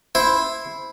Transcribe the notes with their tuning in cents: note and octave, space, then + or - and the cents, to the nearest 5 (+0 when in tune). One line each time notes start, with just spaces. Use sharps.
E4 -5 C5 +0